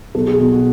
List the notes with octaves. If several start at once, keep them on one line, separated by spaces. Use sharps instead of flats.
B1 A4
G#4
B2 F#4
F#4